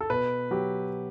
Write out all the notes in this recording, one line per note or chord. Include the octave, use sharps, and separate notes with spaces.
A4
B2 B4
F#3 G4